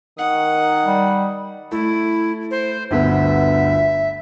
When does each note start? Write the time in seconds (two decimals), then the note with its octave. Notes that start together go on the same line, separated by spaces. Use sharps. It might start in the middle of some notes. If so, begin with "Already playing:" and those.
0.18 D#3 F#5 D#6
0.85 G3
1.72 A3 E4
2.51 C5
2.91 G1 D2 B3 E5